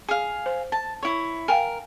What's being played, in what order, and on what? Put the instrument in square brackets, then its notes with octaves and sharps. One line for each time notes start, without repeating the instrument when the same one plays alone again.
[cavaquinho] G#4 F5
[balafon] C5
[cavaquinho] A5
E4 C#5
[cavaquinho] A#4 [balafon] F5 G5 G#5